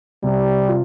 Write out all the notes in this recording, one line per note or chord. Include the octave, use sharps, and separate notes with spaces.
C3 G3
F4